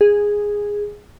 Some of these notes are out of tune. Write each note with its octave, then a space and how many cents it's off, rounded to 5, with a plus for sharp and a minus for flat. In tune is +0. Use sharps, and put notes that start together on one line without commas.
G#4 -10